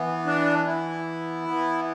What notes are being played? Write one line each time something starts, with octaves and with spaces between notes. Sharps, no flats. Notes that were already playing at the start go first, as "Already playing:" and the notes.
Already playing: E3 B3
D4
E4
E3 B3